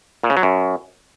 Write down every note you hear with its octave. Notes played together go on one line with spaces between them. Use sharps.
A#2
C#3
F#3
F#2